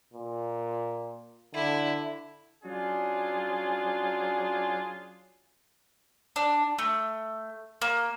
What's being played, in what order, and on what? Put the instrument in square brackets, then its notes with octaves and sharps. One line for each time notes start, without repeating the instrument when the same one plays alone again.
[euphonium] A#2
[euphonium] D3 [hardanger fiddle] E4
[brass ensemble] F#3 C#4 D4 F4 G#4
[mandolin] D4
A3
A#3